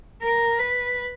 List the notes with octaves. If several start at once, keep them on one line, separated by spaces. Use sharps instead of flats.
A#4
B4